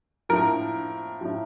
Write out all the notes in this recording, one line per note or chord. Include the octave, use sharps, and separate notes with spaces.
A2 F3 A#4
A2 F3